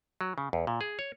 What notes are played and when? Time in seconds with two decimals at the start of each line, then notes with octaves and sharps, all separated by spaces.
0.21 F#3
0.38 C#3
0.53 E2
0.67 A#2
0.81 G#4
0.99 C#5